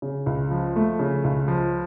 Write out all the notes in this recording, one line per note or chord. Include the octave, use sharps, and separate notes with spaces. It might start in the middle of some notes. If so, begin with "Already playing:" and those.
C#3
C#2
F3
A3
C#3
C#2
F3